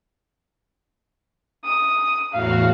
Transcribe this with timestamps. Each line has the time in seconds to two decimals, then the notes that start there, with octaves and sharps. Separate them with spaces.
1.64 D#6
2.32 E2 A2 F#4 F5